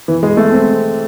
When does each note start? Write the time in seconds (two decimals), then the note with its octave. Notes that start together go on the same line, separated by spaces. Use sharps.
0.08 E3
0.23 G#3
0.37 A3
0.52 C4